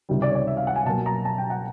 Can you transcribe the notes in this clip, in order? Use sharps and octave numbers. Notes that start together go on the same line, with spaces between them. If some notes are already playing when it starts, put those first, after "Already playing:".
C#2 C3 D#3 G3
D5
C#5
D5
E5
F5
F#5
G#5
B2 F#3 A#3 A5
A#5
A5
G5
F#5